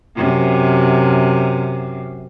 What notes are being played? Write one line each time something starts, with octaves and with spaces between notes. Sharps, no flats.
F#2 C3